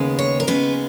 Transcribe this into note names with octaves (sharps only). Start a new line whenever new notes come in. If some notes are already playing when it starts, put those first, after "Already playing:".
Already playing: D#2 C#3 G#3 B3
C#5
A#4
D#2 C#3 G#3 B3 B4